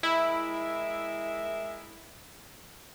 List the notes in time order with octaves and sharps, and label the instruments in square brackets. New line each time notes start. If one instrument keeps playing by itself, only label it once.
[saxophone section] G#3 A#4 E5 [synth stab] E4